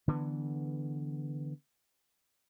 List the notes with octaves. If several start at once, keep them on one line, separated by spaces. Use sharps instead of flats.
D3 E3 B3